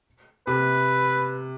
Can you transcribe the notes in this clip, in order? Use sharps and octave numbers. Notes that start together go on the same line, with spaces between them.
C3 B4